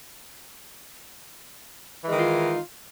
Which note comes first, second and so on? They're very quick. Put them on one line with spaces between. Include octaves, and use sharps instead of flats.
E3 G#3 D#3 D#4 F4